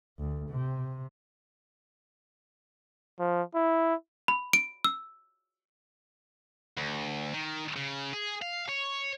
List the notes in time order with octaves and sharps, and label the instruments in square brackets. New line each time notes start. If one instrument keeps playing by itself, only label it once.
[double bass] D2
C3
[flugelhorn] F3
E4
[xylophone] B5
D7
E6
[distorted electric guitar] D2
D#3
C#3
G#4
F5
C#5